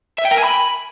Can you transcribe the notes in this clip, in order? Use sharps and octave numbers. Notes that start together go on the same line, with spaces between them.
E5
G5
A#4
G#5
B5